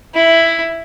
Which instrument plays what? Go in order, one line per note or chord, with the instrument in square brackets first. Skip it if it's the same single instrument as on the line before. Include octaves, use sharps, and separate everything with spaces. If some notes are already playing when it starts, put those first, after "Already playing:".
[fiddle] E4